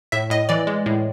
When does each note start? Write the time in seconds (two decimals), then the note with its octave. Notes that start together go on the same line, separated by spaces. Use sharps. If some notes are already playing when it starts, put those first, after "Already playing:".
0.12 A2 E5
0.30 A2 D#5
0.49 E3 D5
0.67 G#3
0.86 A2